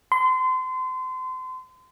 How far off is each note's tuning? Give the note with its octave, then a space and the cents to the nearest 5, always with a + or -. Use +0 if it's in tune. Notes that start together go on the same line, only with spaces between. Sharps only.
C6 -30